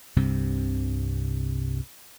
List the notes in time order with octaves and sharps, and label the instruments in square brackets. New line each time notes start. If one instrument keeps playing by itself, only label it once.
[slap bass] C2 G2 C3 C4